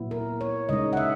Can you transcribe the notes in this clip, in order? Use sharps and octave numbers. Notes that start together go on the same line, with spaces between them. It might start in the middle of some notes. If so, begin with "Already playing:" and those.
Already playing: A#2 F#3 B3 E4
A#4
C#5
C#3 G#3 D#4 D#5
F#5
E5